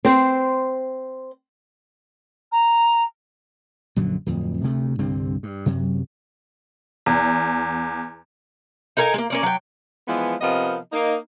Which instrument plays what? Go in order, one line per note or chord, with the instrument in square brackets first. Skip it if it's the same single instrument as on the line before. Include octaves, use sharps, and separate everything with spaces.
[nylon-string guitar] C4 C5
[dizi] A#5
[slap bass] A#1 F#2 D3 F#3
D1 F2
D2 C3 A3
C2 G2 D3 C4
G2
F#2 C3 F#3
[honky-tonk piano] E2
[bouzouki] D#4 A4 A#4 G#5
G#3 A#3
A#3 C#4 D5
F#3 G5
[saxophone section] E3 F3 G#3 B3
C3 F3 B3 A#4 D#5
A#3 D#4